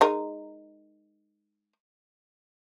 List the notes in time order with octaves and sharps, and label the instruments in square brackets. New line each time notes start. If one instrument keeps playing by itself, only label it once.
[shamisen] G#3 D#4 A#4